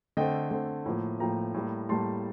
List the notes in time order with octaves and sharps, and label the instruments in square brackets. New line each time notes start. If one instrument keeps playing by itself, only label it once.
[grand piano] D3 A3 C4 D#5 G5
D3 A3 C4
A2 F3 A#3
A2 F3 A#3 G5 A#5
A2 G3 A#3
A2 G3 A#3 A5 C6